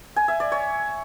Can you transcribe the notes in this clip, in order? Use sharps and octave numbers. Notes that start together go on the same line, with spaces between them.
G#5
E5
D5
C#5